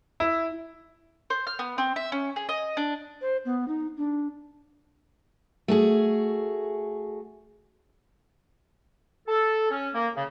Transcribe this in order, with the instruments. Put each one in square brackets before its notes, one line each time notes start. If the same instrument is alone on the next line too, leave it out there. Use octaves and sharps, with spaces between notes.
[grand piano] E4
[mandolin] C5
F6
B3
C4
E5
C#4
G#4
D#5
D4
[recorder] C5
B3
D#4
D4
[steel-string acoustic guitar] A3 F#4 G#4
[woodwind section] A4
C#4
A#3
C#3